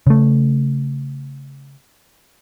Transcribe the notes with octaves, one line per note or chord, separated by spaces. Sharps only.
C#3 A3